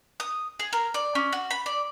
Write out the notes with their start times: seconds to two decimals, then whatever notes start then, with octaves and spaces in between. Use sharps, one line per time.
0.20 D#6
0.59 G#4
0.73 A#4
0.94 D5
1.15 C#4
1.32 F#4
1.51 B5
1.66 D5